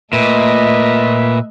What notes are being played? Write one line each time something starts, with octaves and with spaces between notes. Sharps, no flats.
A#2 A3 B4 D#5 E5